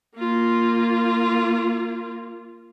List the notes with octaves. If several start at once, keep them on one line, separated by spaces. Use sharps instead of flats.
A#3 F4